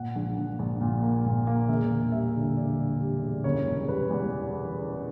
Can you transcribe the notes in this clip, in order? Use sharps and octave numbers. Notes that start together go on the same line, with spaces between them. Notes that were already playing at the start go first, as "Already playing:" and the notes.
Already playing: A#2 F#5
A#1
A#1
A#1
A#2
A#3
A#2
A#3
E1 E5
E1
G3 E5
D3
D3 D5
G3
G3
E1
F#1 C#5
F#1
G3 B4
E2